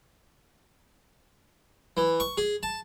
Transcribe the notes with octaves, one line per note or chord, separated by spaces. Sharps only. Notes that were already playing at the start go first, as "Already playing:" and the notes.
E3
C#6
G#4
A5